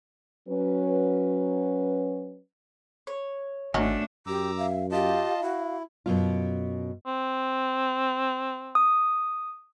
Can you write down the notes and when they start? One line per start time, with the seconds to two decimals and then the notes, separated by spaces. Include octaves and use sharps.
0.49 F#3 C#4 B4
3.07 C#5
3.74 G#1 D#3 F#3 A3 C#4 D4
4.27 F#2 G4 A#5 D6 E6
4.58 E5 F5
4.92 F4 G4 D#5 F5 A5
5.41 E4 F#4
6.06 F#2 B2 F4
7.07 C4
8.75 D#6